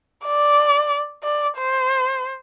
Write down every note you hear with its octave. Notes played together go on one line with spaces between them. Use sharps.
D5
D5
C5